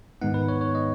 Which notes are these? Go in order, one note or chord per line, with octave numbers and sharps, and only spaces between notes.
G#2 D#3 G#3 B3 D#4 F#5
B4
C#5
C#5
D#5